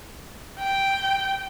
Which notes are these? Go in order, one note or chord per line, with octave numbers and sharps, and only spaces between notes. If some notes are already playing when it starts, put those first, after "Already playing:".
G5